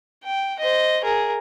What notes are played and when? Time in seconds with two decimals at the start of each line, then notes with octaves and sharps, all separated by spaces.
0.24 G5
0.59 C5 D#5
1.03 G#4 A#4